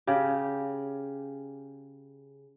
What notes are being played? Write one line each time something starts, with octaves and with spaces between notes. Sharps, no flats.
C#3 G4